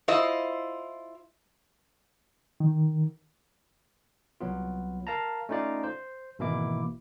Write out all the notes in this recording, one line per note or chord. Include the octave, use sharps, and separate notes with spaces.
E4 F4 C5 D#5
D#3
C2 F#3 B3 F4
A#4 F5 A5 A#5
A3 C#4 D#4 F4 D5 F5
C5
G#1 B2 E3 A#3 E4 D6